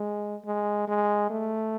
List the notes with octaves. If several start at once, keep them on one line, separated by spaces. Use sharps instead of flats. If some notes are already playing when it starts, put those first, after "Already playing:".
Already playing: G#3
G#3
G#3
A3